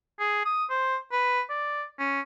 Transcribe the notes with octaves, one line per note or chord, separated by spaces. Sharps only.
G#4
D#6
C5
B4
D5
C#4